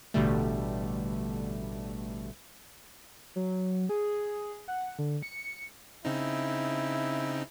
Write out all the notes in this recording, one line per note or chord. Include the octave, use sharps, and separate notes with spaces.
A1 B2 D3 G3 A3
F#3
G#4
F#5
D3
C#7
C#3 C4 D#4 E4